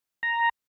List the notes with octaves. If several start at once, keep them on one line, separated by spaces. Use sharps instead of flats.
A#5